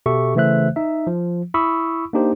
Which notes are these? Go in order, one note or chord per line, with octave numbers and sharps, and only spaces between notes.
B2 G4 A4 E5 C#6
C#3 E3 A3 C5 E5 F#6
D#4 E5
F3
E4 B5 C#6 D#6 E6
A#3 D4 D#4 G4 C5